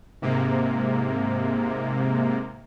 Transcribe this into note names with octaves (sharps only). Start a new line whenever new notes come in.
G#2 C3 A#3